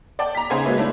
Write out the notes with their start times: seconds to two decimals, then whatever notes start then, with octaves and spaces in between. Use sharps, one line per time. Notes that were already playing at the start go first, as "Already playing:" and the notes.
0.19 D5 F#5 G5 A5 D6
0.35 A#5 B6
0.50 C#3 D#4 C5 F#5 G#5 G#6
0.64 F#3 G#3 A#3 B4 C#5 E5
0.78 A3 D4 E4